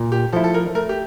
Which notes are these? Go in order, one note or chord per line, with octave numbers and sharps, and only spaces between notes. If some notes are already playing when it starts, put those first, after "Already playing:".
Already playing: A#2
G4
F3 A3 E4 A4
A4
A#4
A3 A#4
G4